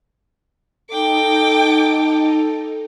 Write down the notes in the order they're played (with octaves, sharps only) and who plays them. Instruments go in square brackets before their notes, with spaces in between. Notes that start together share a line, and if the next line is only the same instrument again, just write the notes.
[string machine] D#4 [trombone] A4 [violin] G5 D6